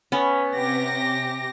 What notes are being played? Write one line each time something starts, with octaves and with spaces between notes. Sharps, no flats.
B3 C#4
C3 G4 A#6